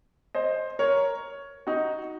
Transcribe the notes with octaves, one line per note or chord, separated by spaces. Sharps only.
C5 D#5
A#4 C#5
D#4 F#4